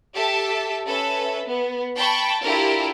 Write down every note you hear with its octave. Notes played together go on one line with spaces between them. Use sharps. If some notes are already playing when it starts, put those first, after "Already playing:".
G4 A4 E5 A5
C#4 A4 B4 E5
B3
G5 A5 B5 C#6
D4 E4 F4 G4 A4 A#4